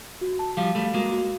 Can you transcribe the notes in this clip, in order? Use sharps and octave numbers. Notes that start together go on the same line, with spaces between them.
F#4
A5
F3 G3 F5
G3 A3 F5
G#3 A#3 F#4
F#4